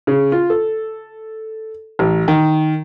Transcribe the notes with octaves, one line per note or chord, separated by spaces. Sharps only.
C#3
F4
A4
A1
D#3